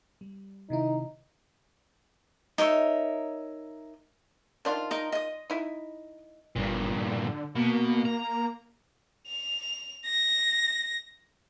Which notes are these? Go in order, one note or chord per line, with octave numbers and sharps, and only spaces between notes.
G3
C3 D#3 D#4 E4
D#4 A#4 C#5 E5
D#3 D4 F4 C5 A5
D#4 A#4 D#6
D#5 D#6
D#4 E4
G1 G2 A#2
D3
B2 A#3
A#5
F7
A#6